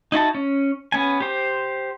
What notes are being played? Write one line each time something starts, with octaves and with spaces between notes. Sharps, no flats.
D#4 E4 F#4 A5
C#4
B3 C#4 G#5
G4 C5